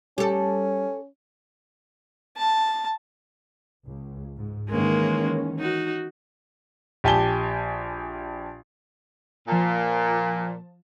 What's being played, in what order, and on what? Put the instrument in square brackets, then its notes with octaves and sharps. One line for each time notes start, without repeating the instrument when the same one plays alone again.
[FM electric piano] G3 [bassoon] C#4 [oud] G4 A4
[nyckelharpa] A5
[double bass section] C#2
G#2
[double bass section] D#3 E3 C#4 [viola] G#3 A#3
[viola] D#4 F#4
[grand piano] A#1 G4 G#5 A5 G7
[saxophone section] A#2 [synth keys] F3 A5